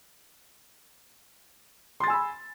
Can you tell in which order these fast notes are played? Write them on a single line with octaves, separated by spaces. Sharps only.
C6 A6 G#5 E6 B5